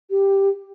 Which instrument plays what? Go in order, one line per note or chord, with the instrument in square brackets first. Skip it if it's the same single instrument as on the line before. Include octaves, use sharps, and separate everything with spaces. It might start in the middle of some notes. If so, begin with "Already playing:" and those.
[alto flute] G4